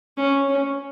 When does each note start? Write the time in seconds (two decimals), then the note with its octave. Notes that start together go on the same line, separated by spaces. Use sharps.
0.17 C#4
0.48 C#4